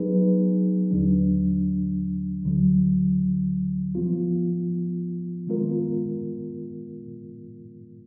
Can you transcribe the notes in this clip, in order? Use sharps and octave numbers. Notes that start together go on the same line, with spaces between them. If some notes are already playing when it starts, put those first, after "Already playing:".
Already playing: F#3 B3 D#4 G#4 B4
D#2 D3 F#3 D4
D2 D3 F#3
F3 B3 F4
D#3 G#3 B3 F4 A#4